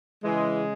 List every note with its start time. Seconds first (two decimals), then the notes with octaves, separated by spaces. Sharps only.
0.24 C#3 E3 G#3